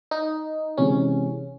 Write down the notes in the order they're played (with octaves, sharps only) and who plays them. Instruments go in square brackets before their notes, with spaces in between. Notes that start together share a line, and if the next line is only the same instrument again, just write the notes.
[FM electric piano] D#4
[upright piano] C3 E3 G#3 [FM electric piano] C#4